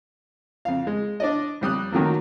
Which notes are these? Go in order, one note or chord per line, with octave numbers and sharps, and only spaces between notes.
F2 F5
G#3
D4 D5 D#5
F2 G3 D#6 F#6
D#3 F#3 A3 A#3